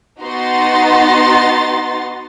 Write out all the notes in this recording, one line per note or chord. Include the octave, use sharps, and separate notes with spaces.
B3 D#4 F#4 A#5 C6 A6